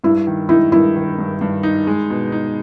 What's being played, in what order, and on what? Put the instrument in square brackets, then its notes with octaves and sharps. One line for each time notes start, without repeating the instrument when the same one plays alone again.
[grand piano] G2 [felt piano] E4
[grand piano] D#3
[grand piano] D#4 [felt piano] E4
[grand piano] G2 [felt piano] E4
[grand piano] D#3
G2
G2
D#4
G#3
B2
D#4